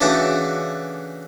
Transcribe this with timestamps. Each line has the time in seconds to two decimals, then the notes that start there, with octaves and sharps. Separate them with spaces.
0.01 C#3 E3 A3 D4 F#4 D6